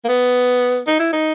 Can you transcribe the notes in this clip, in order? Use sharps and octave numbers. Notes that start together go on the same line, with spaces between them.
A#3
B3
D#4
E4
D#4